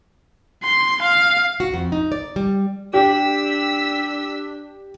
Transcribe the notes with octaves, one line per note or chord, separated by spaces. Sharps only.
C6
F5
F#4
F2
D#4
D5
G3
D4 G4 E6 B6